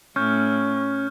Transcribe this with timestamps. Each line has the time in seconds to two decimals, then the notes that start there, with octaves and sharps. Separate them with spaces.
0.16 A2 C#4 C#6 F6 G6